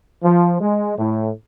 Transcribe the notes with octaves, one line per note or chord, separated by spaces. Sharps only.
F3
G#3
A2